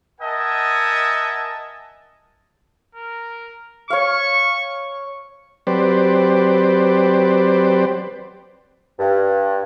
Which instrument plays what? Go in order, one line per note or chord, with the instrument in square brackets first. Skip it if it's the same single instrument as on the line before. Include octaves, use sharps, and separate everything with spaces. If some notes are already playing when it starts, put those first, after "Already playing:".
[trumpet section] A#4 D#5 E5 F#5 G#5 A5
[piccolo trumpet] A#4
[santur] C#5 F5 [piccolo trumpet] C#6
[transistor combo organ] F#3 C4 G4 B4 C5 D5
[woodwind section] G2